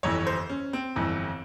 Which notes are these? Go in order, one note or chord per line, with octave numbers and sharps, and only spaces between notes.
G1 F2 E3 C#5
C5
C#4
C4
G1 F2 E3